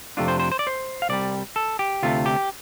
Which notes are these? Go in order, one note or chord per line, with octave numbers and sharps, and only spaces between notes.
F2 C3 A3 D4 F4
C5
C5
C5
D5
C5
F5
C2 C3 G3 D5
A4
G4
D2 C3 A3 F4
G4